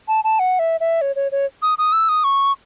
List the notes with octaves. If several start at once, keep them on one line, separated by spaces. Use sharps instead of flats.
A5
A5
F#5
E5
E5
C#5
C#5
C#5
D#6
D#6
E6
D#6
C#6